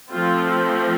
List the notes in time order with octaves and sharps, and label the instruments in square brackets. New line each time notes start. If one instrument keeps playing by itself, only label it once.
[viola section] F3 A3 C4 F4